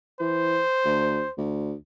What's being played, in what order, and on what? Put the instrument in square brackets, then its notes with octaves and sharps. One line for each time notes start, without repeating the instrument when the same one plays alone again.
[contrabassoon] E3 [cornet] C5
[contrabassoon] D2
D2